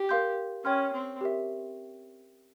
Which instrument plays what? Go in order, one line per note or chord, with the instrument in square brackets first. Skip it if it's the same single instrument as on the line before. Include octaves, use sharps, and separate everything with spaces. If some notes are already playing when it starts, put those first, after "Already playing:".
Already playing: [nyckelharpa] G4
[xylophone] A#4 F5 C6 G6
[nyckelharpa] C#4 [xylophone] C#5 G5 C6 F6
[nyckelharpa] C4
[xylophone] G4 A#4 E5